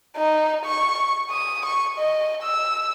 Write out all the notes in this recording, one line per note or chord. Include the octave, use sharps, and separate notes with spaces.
D#4
C#6
D#6
C#6
D#5
E6